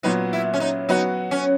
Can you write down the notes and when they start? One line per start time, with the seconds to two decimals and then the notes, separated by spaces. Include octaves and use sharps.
0.03 A#2 F#3 B3 D#4
0.33 E4
0.54 C#4
0.60 D#4
0.89 F#3 B3 D#4 F#4
1.31 C#4